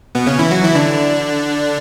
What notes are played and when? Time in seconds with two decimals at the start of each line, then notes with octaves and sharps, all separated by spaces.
0.15 B2 B3
0.26 C#3 C#4
0.39 E3 E4
0.51 F#3 F#4
0.64 E3 E4
0.75 D3 D4